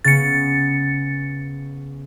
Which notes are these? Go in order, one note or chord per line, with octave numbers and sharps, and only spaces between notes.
C#3 B3 A6 C#7